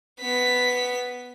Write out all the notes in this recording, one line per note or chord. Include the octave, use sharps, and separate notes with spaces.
B3 B6